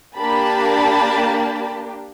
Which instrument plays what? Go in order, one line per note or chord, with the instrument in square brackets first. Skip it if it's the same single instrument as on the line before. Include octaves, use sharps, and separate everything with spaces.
[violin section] A#3 D4 G4 A5 B5